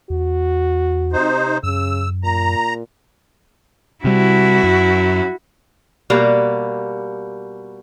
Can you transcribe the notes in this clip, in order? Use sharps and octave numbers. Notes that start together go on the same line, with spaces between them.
E2 F#4
C3 D#4 C5
F#2 C#3 E6
A#2 A#5
C3 G3 E4 F#4
F#2
B2 G3 A#3